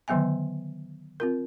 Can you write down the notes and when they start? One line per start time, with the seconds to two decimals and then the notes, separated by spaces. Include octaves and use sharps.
0.08 D3 D#3 F#3 B3 E5 G#5
1.20 C4 F4 A#4